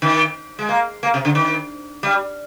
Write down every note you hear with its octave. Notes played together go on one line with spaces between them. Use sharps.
D#3
G#3
A#3
A#3
C3
D3
D#3
G3